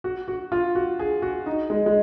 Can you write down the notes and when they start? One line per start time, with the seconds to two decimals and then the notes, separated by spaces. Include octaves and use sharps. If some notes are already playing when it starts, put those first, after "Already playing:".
0.04 F#4
0.28 F#4
0.52 F4
0.75 F#4
0.99 G#4
1.22 F#4
1.46 D#4
1.70 G#3
1.86 G#3